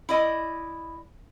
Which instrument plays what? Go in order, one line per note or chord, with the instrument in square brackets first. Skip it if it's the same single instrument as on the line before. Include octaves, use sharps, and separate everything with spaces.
[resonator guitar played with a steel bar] E4 D5 D#5